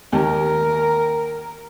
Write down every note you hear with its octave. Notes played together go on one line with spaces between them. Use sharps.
D#2 A#4